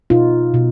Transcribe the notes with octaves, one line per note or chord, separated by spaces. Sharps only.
B2 D#4 F4
B2